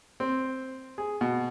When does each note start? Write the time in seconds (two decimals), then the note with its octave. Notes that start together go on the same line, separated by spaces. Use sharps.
0.20 C4
0.98 G#4
1.21 B2